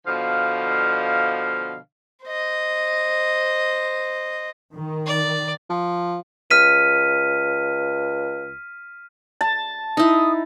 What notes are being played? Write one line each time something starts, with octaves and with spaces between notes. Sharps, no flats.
B2 D3 F3 D#5 F5
C5 D#5
D#3
D5
F3
C#2 F6 B6 D#7
A5
D#4 E4 D#6